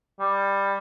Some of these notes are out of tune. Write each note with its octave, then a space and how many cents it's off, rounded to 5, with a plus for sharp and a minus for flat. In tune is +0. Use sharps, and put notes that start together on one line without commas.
G3 +15